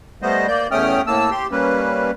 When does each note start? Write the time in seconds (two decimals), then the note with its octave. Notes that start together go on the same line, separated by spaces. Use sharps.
0.22 G3 A3 B3 C5 D#5
0.48 A#3 D5 G6
0.71 E2 A3 C#4 G5 D#6 F6
1.07 A2 A#3 A5 E6
1.31 G4 C6
1.52 G3 A#3 C#4 B4